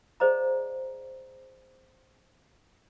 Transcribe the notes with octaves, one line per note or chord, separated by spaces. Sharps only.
G#4 C5 D5 D#5 F5 A#5